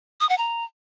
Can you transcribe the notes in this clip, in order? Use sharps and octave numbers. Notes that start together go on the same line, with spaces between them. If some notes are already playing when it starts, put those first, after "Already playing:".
D#6
F#5
A#5